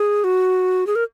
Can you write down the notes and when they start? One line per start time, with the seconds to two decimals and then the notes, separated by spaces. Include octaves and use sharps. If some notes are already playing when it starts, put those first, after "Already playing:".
Already playing: G#4
0.24 F#4
0.87 G#4
0.95 A#4